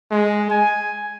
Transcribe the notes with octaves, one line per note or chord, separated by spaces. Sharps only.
G#3
G#5